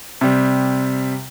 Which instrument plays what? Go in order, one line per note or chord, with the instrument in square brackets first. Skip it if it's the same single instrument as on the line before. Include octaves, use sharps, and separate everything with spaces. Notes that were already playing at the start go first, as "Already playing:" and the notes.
[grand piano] C3 G3